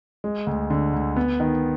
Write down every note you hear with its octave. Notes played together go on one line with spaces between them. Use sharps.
G#3
D2
D3
D2
B3
D#3